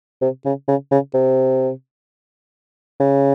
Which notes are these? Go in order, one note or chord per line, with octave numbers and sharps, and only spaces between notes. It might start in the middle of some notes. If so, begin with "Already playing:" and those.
C3
C#3
C#3
C#3
C3
C#3